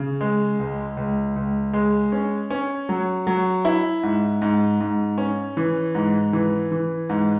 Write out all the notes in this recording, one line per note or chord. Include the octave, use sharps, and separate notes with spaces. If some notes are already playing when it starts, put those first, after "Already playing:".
Already playing: C#3
G#3
C#2
C#2
C#2
G#3
C#4
C#4
F#3
F#3
E4
G#2
G#2
G#2
C#4
E3
G#2
E3
E3
G#2